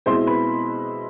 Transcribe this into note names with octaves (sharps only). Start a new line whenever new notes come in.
B2 G#3 C4 E4 C5 C6
B4 B5